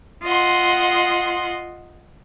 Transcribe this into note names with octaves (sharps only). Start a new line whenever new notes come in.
F4 D#5 F#5 C6